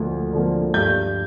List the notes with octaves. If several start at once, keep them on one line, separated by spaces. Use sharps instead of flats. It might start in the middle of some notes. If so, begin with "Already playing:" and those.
Already playing: D2 D3 F3 A#3
D3 F3 A#3
G2 G6